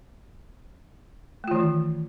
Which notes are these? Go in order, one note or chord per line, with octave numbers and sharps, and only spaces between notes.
D#3 E3 A3 F4